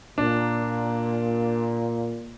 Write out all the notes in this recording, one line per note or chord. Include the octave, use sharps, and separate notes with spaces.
A#2 D4